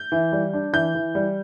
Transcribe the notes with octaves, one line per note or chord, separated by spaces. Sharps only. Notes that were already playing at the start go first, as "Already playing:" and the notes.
Already playing: G6
E3
G3
D4
E3 G6
E3
G3